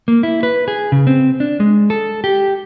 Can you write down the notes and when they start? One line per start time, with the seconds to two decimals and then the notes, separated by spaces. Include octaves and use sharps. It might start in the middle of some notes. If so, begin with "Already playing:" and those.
0.08 A#3
0.23 E4
0.43 B4
0.68 G#4
0.92 C#3
1.07 C4
1.40 D4
1.60 G#3
1.90 A4
2.24 G4